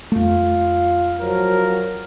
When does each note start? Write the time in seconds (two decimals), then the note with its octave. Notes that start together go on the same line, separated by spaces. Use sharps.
0.12 F2 A3 F4 F5
1.19 F3 F#3 A#4